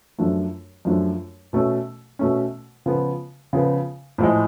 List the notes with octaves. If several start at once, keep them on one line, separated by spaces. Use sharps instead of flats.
F#2 F3 A3 D4
F#2 F3 A3 D4
B2 A3 C#4
B2 A3 C#4
C#3 F3 B3
C#3 F3 B3
A2 F3 G#3